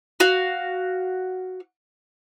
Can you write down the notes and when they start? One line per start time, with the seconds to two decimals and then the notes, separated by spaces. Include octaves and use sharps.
0.20 F#4 F5